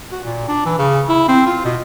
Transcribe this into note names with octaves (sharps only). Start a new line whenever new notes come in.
F#4
A#2
D4
E3
C#3
E4
C4
F4
B2